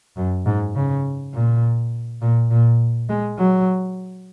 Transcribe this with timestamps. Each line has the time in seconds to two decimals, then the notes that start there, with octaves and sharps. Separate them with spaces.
0.17 F#2
0.46 G#2
0.75 C#3
1.34 A#2
2.22 A#2
2.50 A#2
3.09 G#3
3.38 F#3